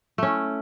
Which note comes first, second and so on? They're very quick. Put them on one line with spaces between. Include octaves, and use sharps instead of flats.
A3 C#4 E4